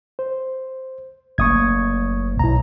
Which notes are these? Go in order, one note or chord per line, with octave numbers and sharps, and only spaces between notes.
C5
F#1 A3 A#3 C#6 D#6 G#6
B1 E4 A#5